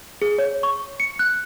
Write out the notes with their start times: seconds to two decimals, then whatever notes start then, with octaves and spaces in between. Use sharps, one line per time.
0.22 G#4
0.38 C#5
0.63 C#6
1.00 C#7
1.19 F#6